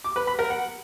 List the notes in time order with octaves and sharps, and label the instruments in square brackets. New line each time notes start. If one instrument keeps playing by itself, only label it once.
[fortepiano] D6
B4
B5
A#4
F#5